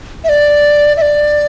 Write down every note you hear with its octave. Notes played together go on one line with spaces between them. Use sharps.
E5
D5
E5
D5